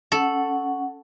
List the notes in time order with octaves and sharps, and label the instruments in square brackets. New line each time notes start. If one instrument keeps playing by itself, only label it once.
[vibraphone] C#4 F#5 [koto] A4